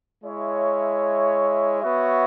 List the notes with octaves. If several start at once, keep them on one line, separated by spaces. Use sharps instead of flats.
G#3 E4 C#5 E5
B3 F#4 C#5 E5